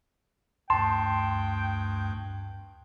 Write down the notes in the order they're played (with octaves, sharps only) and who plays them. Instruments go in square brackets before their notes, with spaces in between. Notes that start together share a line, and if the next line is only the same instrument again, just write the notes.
[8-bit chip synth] D2 G2 [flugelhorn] G5 [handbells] A5 [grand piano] C6